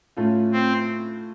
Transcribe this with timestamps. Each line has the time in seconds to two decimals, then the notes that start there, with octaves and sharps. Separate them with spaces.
0.17 A2 A3 C#4 F4
0.52 C4